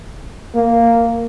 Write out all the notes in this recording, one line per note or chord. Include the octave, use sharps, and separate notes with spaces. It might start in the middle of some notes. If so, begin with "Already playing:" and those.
A#3